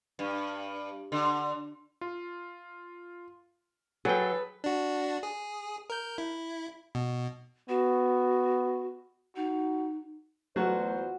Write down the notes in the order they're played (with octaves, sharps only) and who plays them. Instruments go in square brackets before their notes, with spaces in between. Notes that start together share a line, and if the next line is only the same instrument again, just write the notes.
[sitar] G2
D3
[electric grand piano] F4
[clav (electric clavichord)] F#3 G5 [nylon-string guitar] G#4 [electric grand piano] A4 [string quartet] B4
[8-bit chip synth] D4 F#4
G#4
A#4 G6
E4
B2
[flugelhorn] B3 [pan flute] F#4
[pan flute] D#4 [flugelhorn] F#4
[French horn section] E2 B4 C5 [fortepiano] F#3 [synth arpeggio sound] A3 [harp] F4 F#4